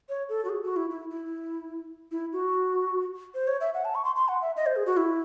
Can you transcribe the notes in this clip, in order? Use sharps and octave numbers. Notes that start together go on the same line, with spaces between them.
C#5
A4
F#4
G#4
F#4
E4
E4
E4
E4
F#4
C5
C#5
E5
F#5
A5
C#6
C6
C6
F#5
E5
D#5
C5
G#4
F#4
E4